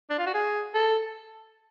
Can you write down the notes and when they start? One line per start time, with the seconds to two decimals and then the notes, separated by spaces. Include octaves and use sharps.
0.10 D4
0.18 F4
0.26 F#4
0.34 G#4
0.74 A4